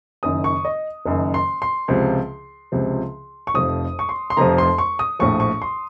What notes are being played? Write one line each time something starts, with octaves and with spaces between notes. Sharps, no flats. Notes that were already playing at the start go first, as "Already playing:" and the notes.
F#1 F#2 D#3 D#6
C#6
D#5
F#1 F#2 D#3
C6
C6
C#2 C3 F3
C#2 C3 F3
C#6
F1 F2 C3 F3 D#6
C#6
C6
C6
F1 F2 C3 F3 A#5
C6
C#6
D#6
A#1 A2 F3 C#6
C#6
C6